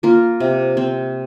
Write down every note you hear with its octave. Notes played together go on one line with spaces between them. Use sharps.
A#3 F4 A#4
C3
C4